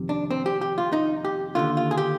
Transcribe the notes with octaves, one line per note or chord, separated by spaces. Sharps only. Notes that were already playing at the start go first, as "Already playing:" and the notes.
Already playing: F2 C3 D#3
D4
C4
G4
G4
F4
D#4
G4
D#2 D3 F4
F4
G#4
G4